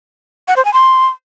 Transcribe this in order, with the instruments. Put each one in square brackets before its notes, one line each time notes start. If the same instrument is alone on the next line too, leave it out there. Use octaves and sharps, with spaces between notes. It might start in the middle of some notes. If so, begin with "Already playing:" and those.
[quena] F#5
C5
G#5
C6